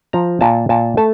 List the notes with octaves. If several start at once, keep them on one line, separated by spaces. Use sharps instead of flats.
F3 A#5
A#2 A5
A#2 A5
A3 A5